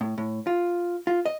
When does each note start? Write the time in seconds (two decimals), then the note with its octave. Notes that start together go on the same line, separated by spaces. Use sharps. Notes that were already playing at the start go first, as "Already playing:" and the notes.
0.01 A2
0.18 A2
0.47 F4
1.07 F4
1.26 D#5